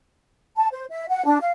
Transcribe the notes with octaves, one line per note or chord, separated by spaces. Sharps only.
A5
C5
E5
F#5
D4
F5